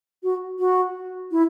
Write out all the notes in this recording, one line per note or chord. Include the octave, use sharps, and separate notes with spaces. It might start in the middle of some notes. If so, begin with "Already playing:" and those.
F#4
F#4
E4